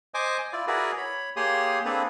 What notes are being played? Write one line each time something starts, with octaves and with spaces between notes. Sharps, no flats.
C5 D#5 G#5 D6
E4 F4 D5
E4 F#4 G#4 A#4 B4 D5
C#5 B5
A#3 G4 G#4 C#5 C6 D#6
A#3 C4 D4 G#4 A4 B4